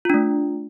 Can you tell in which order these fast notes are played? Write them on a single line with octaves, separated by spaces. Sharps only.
F4 D4 A3